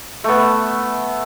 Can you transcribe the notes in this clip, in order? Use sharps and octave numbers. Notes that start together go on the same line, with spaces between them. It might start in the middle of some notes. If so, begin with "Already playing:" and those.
A3 B3